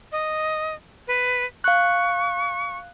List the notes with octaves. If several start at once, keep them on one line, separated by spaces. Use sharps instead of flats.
D#5
B4
F5 C#6 F#6